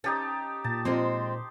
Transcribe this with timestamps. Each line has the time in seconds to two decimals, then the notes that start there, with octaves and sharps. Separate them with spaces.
0.04 C#4 D#4 G4 A5
0.64 A#2 A5
0.85 F3 G#3 C4 D#5 C6